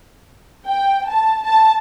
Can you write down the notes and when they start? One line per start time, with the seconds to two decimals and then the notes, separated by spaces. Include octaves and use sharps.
0.67 G5
1.10 A5
1.45 A5